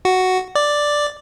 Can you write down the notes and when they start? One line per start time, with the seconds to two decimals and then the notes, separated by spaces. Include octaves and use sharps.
0.05 F#4
0.55 D5